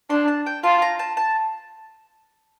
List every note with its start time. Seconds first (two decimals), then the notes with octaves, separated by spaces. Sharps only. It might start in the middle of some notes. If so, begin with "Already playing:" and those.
0.10 D4 C6
0.28 A5
0.46 G5
0.64 F4 A5
0.82 A#5
0.99 A5
1.17 A5